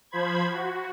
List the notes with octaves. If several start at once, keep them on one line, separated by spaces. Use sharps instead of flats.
F3 C5 B5 G#6
F#4